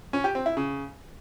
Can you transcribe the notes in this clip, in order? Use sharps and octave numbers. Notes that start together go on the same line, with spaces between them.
C#4
G4
C4
E4
C#3